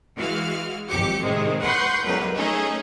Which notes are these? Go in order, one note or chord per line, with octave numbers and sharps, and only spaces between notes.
E3 G#3 F#4 F5 F6
G#1 F2 F#3 G4 D6 C#7
A2 C3 D#3 G#3 C4
B4 F#5 C6 C#6 F#6 G6
G1 C#2 F#3 A#4 B4
A3 C#4 D#4 G#4